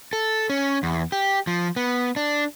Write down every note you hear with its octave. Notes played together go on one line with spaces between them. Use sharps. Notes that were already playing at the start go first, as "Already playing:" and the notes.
A4
C#4
E2
G4
F3
B3
D4